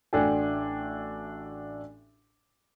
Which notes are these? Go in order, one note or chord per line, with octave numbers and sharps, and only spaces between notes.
A1 D4 F#4 A4 G5 G#5